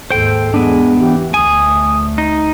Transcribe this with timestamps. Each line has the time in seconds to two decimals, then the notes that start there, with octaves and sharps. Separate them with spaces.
0.10 D#2 G#2 A4 C5 G5
0.54 E2 G#3 B3 D4
0.99 E3 G4
1.34 D2 A3 G#5 D#6
2.18 D#4